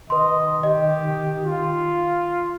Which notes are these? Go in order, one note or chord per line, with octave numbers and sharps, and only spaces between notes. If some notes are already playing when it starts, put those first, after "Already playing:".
D#3 B4 D#5 C6
G4 D#5
F4